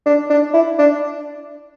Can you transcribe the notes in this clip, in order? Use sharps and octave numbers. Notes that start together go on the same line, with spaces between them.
D4
D4
E4
D4